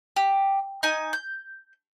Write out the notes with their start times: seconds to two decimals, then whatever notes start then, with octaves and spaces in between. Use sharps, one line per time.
0.16 G4
0.83 D#4 G#5
1.13 G6